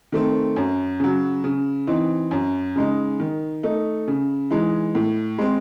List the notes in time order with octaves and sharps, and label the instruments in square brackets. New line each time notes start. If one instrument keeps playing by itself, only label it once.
[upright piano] D#3 A3 C4
F#2
C#3 F#3
C#3
E3 C4 D#4
F#2
C#3 G#3 D#4
D#3
A3 D#4
C#3
E3 G#3 D#4
A2
G#3 C4